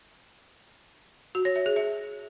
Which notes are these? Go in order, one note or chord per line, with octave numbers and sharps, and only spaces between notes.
F#4
C#5
E5
G#4
E5